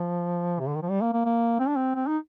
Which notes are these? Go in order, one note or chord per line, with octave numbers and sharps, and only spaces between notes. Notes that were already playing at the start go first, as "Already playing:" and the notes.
Already playing: F3
C3
D3
D#3
F3
G3
A#3
A#3
A#3
C4
D4
C4
C4
D#4